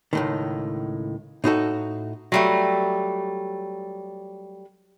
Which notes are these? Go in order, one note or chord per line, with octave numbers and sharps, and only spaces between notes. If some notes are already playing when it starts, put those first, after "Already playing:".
C#2 A2 D#3
A2 D#4 F#4 A4
F#3 G3 A3